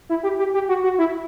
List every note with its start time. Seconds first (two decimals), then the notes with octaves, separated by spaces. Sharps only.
0.09 E4
0.23 G4
0.39 G4
0.54 G4
0.68 F#4
0.84 F#4
0.98 E4